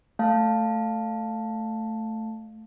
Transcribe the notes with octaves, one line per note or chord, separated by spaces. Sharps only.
A3 F5 A5